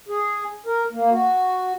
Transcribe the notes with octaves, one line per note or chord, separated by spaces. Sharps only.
G#4
A#4
A#3
F#4